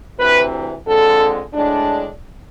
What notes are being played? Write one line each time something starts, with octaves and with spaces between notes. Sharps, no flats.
D2 C3 E3 B4
F2 D3 G#3 A4
A2 G#3 D4